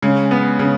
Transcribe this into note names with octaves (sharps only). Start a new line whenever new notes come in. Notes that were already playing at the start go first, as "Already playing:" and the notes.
C#3 G#3
B3
C#3